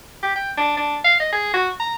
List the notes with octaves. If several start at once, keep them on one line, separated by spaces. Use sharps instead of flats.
G4
G5
D4
D4
F5
D#5
G#4
F#4
A#5